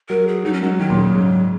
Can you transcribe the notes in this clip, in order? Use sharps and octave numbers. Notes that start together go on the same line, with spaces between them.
F#3 A#4
G#4
F#3 D#4
C#4
F#3 G#3
D#3 F#3
A#2
C#3
G#2